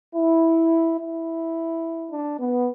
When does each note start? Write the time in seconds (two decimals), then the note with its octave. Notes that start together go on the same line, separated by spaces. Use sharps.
0.16 E4
0.99 E4
2.12 D4
2.39 B3